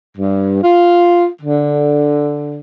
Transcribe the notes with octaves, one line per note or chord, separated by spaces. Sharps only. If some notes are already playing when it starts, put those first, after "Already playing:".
G2
F4
D3